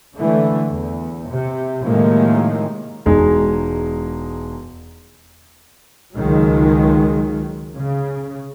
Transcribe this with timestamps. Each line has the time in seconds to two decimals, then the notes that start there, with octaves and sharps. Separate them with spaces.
0.14 D3 E3 A3
0.67 E2
1.29 C3
1.84 A2 C3 D#3 F3 G#3 A#3
3.06 E1 G#3 D#4 G#4
6.16 C#2 D#3 F#3 G#3
7.78 C#3